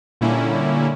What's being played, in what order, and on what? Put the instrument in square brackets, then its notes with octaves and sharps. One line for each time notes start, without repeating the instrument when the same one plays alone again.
[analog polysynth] A#2 D3 G3 A#3 C#4 E4